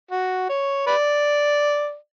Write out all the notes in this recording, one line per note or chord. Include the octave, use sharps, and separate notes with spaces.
F#4
C#5
B4 D5